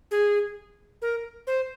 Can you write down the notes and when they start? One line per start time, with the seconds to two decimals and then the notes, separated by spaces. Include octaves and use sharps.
0.11 G#4
1.02 A#4
1.47 C5